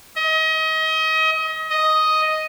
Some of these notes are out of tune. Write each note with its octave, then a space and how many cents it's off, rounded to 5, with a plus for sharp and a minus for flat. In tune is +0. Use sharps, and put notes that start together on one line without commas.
D#5 +30
D#5 +5